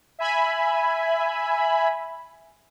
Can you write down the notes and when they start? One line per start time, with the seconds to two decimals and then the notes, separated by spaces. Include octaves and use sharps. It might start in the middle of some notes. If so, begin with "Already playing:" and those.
0.19 E5 G#5 B5